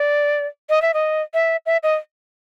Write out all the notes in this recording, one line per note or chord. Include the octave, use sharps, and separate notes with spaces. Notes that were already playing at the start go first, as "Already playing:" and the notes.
Already playing: D5
D#5
E5
D#5
E5
E5
D#5